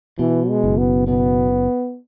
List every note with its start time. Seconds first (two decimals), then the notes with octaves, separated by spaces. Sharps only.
0.19 B2 E3
0.49 G#3
0.64 F#1
0.78 B3
1.08 B2 B3